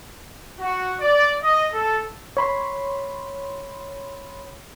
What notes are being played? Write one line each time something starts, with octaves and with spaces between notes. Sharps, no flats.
F#4
D5
D#5
A4
C#5 B5 C6